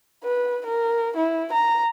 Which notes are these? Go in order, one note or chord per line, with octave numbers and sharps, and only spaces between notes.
B4
A#4
E4
A#5